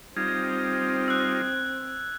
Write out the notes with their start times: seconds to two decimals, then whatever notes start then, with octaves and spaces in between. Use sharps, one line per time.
0.17 G3 C4 D#4 F4 G#6
1.08 E6 F#6